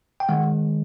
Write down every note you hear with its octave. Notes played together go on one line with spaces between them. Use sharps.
G5
D#3 G#3 F#5